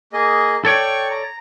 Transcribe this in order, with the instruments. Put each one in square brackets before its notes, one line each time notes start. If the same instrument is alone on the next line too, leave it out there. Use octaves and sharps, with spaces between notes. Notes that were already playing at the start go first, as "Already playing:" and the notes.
[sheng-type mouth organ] A#3 G#4 D#5
[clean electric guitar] A4 C#5 D5 [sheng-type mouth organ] G5 C#6
[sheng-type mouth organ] A#5